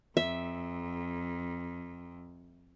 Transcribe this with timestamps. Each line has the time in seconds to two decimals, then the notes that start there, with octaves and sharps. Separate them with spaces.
0.17 F2 E5